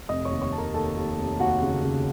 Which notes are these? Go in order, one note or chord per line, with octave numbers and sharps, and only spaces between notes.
F1 D#5 D#6
C#5 C#6
D#2
C#5 C#6
F1 A5
A#4 A#5
D#2 A4 A5
D#2
F1
D#2 F#4 F#5
C#3
C#3